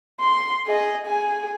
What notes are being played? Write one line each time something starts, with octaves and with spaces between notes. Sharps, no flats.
C6
G#4 D#5
G#4 G#5